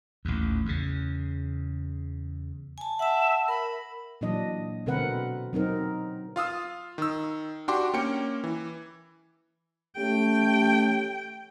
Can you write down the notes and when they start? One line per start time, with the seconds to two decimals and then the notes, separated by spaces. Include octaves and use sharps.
0.25 A1 D#2
0.65 E2 C#3
2.78 G#5 A5
2.99 E5 F#5 A5
3.48 A#4 B5
4.21 A#2 E3 F#3 D4 D#5
4.86 B2 D3 C4 A#4 B4 F#5
5.53 F#3 C4 D#4 A#4
6.36 F4 F5 D#6 E6
6.98 D#3 E6
7.68 D4 F#4 G4 G5 C6 D6
7.94 A#3 C#4 G5 C#7
8.44 E3
9.97 A3 C#4 G4 G5